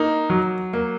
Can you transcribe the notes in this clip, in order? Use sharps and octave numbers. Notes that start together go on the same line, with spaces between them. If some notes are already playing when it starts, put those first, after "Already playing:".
Already playing: A#3 D#4
F#3
A#3